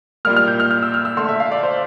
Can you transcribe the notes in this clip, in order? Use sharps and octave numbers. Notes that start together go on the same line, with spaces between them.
A#2 G3 A#3 F6
F6
G6
F6
F6
E6
F6
E6
D3 A3 C6
E5
F5
D5
C5